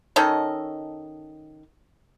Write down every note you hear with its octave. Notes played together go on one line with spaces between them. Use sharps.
D#3 C#4 A4 D#5